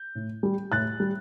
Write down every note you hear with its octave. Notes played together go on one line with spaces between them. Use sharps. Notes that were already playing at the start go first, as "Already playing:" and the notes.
Already playing: G6
A2
G3
A2 F#6 A6
G3